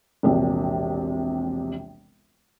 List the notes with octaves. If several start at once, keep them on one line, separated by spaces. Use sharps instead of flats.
E1 A#1 C3